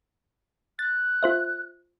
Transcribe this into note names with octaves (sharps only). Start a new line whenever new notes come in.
F#6 A6
F4 C5 E5